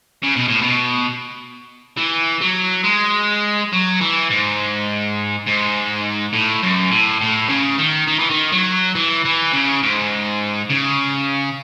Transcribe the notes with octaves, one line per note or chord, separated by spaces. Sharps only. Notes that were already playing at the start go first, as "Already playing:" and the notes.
C#3
B2
A2
B2
E3
F#3
G#3
F#3
E3
G#2
G#2
A2
F#2
A2
A2
C#3
D#3
D#3
E3
D#3
F#3
E3
E3
C#3
G#2
C#3